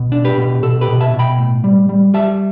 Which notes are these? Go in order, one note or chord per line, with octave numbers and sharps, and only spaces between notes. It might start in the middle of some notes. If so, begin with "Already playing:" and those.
Already playing: B2
D4
G4 B4
B2
B2 A4
G4 B4
B2
E5 A5
B2
G5 B5
A2
G3
G3
G3 E5 A5